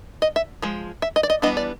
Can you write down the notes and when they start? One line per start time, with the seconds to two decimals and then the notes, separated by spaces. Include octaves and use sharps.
0.22 D#5
0.36 E5
0.62 F3 G#3
1.02 E5
1.16 D#5
1.23 D5
1.30 D#5
1.42 E3 G3 B3 D4 D#5
1.57 D5